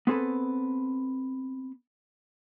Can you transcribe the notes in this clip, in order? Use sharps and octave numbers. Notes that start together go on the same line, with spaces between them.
B3 C4 G#4 A4 B4